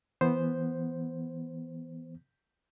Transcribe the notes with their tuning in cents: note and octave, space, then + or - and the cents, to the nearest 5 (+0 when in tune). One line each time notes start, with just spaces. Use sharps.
E3 +0 B3 +0 C5 +0